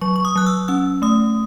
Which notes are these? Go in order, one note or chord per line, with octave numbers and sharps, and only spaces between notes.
F#3 C#6
C#6
D#6
F#3 F#6
E6
C#4 E6
A3 D#6